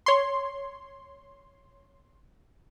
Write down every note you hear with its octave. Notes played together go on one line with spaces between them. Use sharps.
C#5 C6